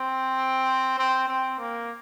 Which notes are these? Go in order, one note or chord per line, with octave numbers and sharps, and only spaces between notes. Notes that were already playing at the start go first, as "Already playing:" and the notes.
Already playing: C4
C4
C4
A#3